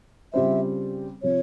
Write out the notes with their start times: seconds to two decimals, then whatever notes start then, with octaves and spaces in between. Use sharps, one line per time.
0.33 C#3 G3 C4 F4 C5 E5
1.23 C3 F3 C#5